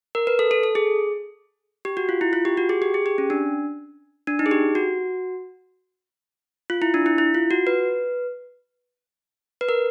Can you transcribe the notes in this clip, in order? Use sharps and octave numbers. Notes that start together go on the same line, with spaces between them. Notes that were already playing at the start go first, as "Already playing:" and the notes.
A#4
B4
A4
A4
A4
G#4
G4
F#4
F4
E4
F4
G4
F#4
G#4
G4
G#4
G4
C#4
D4
D4
D#4
G#4
G4
F#4
F4
E4
D4
E4
E4
F4
F#4
B4
B4
A#4